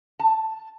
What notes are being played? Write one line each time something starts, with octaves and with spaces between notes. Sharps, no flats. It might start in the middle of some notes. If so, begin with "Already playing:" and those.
A5